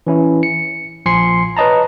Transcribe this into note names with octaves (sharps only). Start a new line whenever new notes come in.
E3 C#4 E4
C#7
A#1 F3 G#5 C6 C7 C#7
B4 C#5 D#5 A5 A#5